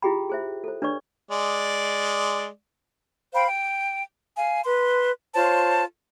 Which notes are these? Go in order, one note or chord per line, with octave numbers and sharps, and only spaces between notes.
E4 F4 G4 G#4 G5 B5
G#4 C5 E5
A4 C5
D4 B4 C#5 D5 C#6
G#3 D5
C5 F5 G5 B5
G5
F5 G#5
B4 C6
F4 C5 C#5 A5